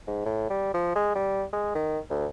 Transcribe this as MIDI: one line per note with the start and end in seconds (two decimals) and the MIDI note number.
0.08 0.23 44
0.25 0.49 45
0.50 0.70 55
0.74 0.95 53
0.95 1.15 56
1.15 1.44 55
1.53 1.72 56
1.75 1.99 51
2.10 2.27 38